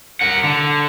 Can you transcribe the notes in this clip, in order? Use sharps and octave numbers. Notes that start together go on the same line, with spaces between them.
A#4 F#5
D3